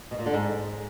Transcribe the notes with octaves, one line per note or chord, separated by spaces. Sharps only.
B2
A#2
D3
G#2